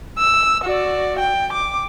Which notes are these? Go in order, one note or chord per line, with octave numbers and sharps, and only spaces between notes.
E6
F#4 D5
G5
D6